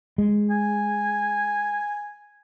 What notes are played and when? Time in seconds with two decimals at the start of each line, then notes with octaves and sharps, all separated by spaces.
0.18 G#3
0.50 G#5